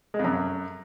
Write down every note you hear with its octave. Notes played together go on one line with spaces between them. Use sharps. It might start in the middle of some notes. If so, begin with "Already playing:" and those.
G#3
F2
F#2